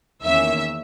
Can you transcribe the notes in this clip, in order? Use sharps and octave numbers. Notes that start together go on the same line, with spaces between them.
E2 D#3 A#3 C#4 E5